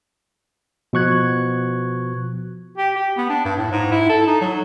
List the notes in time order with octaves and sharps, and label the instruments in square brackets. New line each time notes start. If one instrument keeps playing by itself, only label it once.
[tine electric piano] B2 F3 C#6 F#6 G#6
[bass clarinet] G4
G4
B3
D4
G2
A2
G#2
E4
A4
D#4
F#3